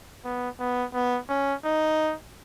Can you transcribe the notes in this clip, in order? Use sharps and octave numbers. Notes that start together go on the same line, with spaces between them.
B3
B3
B3
C#4
D#4